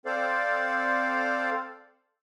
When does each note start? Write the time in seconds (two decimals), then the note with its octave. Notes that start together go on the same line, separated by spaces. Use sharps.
0.06 C4 A4 C5 D5 F5